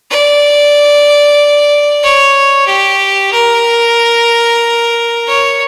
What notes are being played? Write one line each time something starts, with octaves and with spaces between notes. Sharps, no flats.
D5
C#5
G4
A#4
C#5